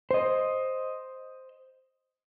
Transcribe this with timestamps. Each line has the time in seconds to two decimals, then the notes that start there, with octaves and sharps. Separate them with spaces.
0.11 C5 D#5